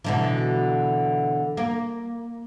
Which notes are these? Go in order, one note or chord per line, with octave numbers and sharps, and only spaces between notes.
B2 D3 E3
A#3